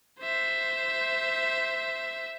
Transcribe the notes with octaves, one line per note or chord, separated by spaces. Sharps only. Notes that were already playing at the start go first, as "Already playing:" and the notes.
C5 E5